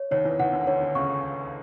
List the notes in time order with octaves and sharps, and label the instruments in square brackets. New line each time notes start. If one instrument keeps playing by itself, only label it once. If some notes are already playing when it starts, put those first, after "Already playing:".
Already playing: [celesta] C#5
[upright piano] D#2 D#3 [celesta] C#5
[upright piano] E2 E3
[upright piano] D#2 D#3 [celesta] F#5
[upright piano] D2 D3
[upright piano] D2 D3 [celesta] C#5
[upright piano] D2 D3
[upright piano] C#2 C#3 [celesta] C#6